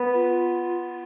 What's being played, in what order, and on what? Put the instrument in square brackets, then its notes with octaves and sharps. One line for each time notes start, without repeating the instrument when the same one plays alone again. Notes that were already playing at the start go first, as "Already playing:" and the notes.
Already playing: [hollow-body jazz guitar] B3 B4
[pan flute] F4